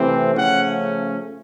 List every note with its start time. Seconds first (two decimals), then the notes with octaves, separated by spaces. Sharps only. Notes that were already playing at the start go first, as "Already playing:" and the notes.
Already playing: C3 E3 A3 C4
0.34 C#3 F3 A3 C#4 F#5